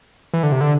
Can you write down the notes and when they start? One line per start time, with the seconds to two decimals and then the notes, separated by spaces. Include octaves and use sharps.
0.34 E3
0.43 D3
0.52 C3
0.61 D3